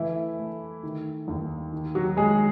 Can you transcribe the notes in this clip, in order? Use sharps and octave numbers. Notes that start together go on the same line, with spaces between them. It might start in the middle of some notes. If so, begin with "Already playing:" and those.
Already playing: E3 A3 E4
A3
D#3
D#2
D#3
F#3 F#4
F#3 G#3 G#4